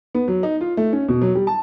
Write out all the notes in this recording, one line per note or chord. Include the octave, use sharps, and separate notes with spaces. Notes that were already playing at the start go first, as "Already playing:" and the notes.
B3
F#3
D#4
F4
A3
C#4
B2
F#3
G3
A5